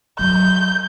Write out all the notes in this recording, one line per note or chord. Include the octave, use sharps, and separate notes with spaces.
F#3 G6